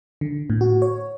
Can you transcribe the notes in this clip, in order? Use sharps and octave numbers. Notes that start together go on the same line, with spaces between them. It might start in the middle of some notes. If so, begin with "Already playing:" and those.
D3
A2
F#4
C#5